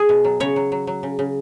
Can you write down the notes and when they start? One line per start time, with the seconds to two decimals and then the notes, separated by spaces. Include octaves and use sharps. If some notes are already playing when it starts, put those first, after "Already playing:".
Already playing: G#4
0.09 B2
0.24 F#3
0.40 C#3 C#5
0.56 F#3
0.72 F#3
0.87 F#3
1.03 C#3
1.19 C#3